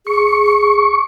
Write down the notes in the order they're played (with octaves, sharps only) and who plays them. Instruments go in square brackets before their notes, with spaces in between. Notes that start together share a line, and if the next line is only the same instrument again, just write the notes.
[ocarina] G#4 [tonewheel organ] C#6